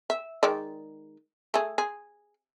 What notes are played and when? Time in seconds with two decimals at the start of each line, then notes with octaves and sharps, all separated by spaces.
0.10 E5
0.43 D#3 G#3 D5
1.54 A3 G#4
1.78 G#4